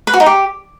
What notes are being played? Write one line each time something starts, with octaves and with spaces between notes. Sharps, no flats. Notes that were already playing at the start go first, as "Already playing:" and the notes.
B4
F#4
D#4
G4